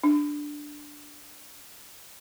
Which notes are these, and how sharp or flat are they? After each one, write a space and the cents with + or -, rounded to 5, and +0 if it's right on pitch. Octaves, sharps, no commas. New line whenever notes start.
D4 +5